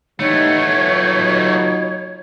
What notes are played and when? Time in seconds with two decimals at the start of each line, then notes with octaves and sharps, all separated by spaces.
0.19 E3 G3 A3 B3 D#4 C#5
0.75 F#3 D#4 F4